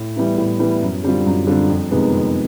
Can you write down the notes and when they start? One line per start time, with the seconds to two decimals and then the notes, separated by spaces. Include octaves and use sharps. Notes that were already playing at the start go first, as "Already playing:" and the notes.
Already playing: A2
0.16 E3 G3 B3 E4
0.38 A2
0.59 E3 G3 B3 E4
0.81 F#2
1.04 D3 G3 C4 F4
1.26 F#2
1.47 D3 G3 C4 F4
1.69 F2
1.91 C3 D#3 G#3 B3
2.14 F2